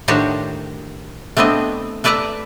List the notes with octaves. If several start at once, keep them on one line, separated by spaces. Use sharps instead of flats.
A2 D#3 D4 F#4 G4 C5
A3 B3 C4 D4 D#5
A3 B4 D5 E5 A5 A#5